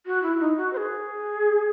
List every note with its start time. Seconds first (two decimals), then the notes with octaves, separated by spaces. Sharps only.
0.06 F#4
0.23 E4
0.40 D#4
0.57 F#4
0.73 C5
0.77 G#4